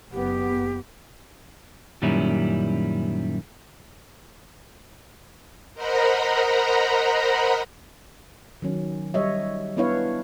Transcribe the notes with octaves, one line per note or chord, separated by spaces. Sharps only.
F#1 B3 G4
F#2 A#2 D#3 G3 C#4 E4
A#4 C5 D#5 F#5 A#5 B5
D#3 F#3 C#4
G3 C#5 D#5 E5
B3 D4 E4 B4 C#5 F5